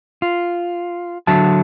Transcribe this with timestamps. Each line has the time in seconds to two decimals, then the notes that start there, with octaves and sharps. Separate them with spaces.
0.22 F4
1.27 D3 F#3 E5 A5